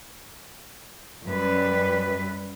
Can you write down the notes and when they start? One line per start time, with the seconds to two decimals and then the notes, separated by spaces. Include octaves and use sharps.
1.26 F#2 G3 B4